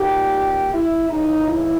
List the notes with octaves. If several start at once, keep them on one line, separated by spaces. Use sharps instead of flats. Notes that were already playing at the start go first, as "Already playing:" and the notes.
Already playing: A#2 A#3 D#4 G4
E4
D#2 C#3 E3 D#4
E4